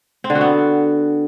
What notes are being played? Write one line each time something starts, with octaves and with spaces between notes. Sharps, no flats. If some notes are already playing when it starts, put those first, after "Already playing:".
C4
D3
F#4
B3